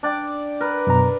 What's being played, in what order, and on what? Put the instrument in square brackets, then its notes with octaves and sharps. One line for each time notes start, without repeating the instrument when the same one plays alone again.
[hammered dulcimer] D4 D5 G5
A#4 B4
[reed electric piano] F#2 B2 A#5